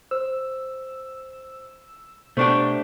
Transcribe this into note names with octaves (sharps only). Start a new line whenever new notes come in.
C5 E6
B2 A3 D4 G4 C5 C#6